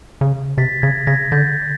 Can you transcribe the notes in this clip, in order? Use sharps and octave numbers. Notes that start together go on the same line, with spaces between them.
C#3
C3 A6 B6
C#3 G#6 A#6
C#3 G#6 A#6
D3 G6 A6